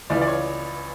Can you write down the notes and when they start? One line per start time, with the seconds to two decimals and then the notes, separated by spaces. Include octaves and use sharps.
0.10 C#2 C#3 E3 D5
0.22 D5
0.28 C#5